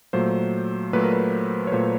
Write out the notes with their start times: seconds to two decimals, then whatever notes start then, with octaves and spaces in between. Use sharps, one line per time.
0.13 A#2 F#3 A3 C5
0.93 A#2 F#3 A3 B4
1.03 A#4
1.13 B4
1.67 C#5
1.72 A#2 F#3 A3 C5